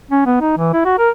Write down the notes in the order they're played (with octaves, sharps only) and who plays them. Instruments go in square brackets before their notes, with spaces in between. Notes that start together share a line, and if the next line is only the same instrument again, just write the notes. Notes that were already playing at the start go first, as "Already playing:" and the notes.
[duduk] C#4
B3
D#4
E3
E4
F#4
A#4